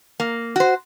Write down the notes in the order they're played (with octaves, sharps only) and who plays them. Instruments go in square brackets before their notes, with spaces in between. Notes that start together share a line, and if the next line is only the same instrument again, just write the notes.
[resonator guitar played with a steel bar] A#3
F#4 C5